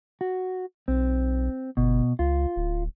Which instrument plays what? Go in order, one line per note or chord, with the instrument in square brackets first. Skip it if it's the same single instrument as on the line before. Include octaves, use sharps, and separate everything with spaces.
[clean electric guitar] F#4
[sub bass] B1 [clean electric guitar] C4
[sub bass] G1 [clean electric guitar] B2
[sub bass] C#2 [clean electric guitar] F4
[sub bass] D1